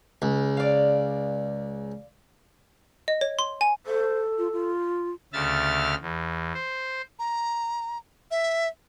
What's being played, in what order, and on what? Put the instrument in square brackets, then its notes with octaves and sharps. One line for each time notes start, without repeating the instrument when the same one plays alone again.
[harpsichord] C#2
[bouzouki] D5 F5
[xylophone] D#5
C#5
C6
G#5
[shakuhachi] A4 [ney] C5
[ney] F4
F4
[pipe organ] D2 C#3 E5 F6 A6
E2
C5
[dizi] A#5
E5